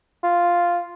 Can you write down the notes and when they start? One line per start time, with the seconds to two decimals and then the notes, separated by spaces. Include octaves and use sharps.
0.24 F4